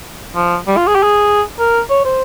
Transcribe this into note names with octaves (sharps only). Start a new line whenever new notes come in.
F3
G3
F4
G#4
G4
G#4
A#4
C#5
C5